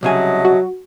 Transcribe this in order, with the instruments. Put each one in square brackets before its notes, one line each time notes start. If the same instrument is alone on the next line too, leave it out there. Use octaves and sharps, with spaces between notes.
[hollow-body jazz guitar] C2 C#3 G#5 [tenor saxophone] F#3 [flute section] D#5 E5 A5
[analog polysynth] F#4